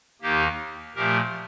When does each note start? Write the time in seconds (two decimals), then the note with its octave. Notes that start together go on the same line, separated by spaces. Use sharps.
0.21 D#2 D#3 A#3 D#4 G4
0.95 A#2 F3 A3 G4 A#4